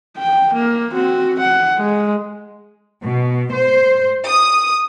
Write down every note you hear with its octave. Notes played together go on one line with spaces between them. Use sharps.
G5
A#3
C4 F#4
F#5
G#3
B2
C5
D#6